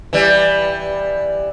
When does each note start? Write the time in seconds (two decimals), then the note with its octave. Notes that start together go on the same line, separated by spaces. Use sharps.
0.13 E3 G3